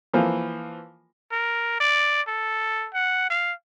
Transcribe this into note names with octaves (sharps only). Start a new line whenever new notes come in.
E3 F3 A#3
A#4
D5
A4
F#5
F5